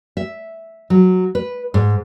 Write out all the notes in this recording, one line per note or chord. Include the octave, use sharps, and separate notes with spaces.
E5
F#3
B4
G#2